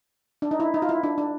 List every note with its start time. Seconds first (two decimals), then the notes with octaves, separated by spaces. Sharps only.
0.42 D4
0.51 D#4
0.60 E4
0.74 D#4
0.82 F4
0.89 E4
1.04 D4
1.18 D4